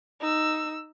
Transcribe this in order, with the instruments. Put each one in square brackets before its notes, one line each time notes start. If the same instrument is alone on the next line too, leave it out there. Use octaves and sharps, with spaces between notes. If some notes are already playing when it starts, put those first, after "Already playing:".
[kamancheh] D#4 E6